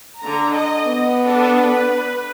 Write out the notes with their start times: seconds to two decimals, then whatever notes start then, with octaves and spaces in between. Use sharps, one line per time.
0.20 D3 A#5
0.53 D#5
0.87 B3
1.24 D4 A4
1.63 B4